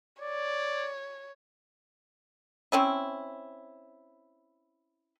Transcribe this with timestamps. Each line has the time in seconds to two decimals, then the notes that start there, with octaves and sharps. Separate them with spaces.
0.22 C#5 D5
2.72 C4 C#4 E4